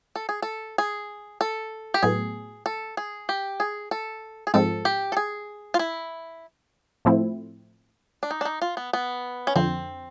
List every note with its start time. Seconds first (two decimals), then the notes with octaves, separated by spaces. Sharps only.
0.16 A4
0.29 G#4
0.42 A4
0.78 G#4
1.41 A4
1.94 G4
2.03 A2 F#3 B3 G#4
2.66 A4
2.97 G#4
3.29 G4
3.60 G#4
3.91 A4
4.47 G#4
4.54 G#2 F3 G#3 C4 A4
4.85 G4
5.12 A4
5.17 G#4
5.74 F4
5.79 E4
7.05 A2 F3 A3 C4 E4
8.23 D4
8.31 D#4
8.41 D4
8.45 D#4
8.62 F4
8.77 B3
8.93 B3
9.47 C#4
9.56 F2 D3 F3 C4